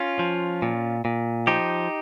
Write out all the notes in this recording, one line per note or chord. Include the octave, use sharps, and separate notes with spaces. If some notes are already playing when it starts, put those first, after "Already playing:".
Already playing: C#4 F4
F3
A#2
A#2
F3 D#4 G4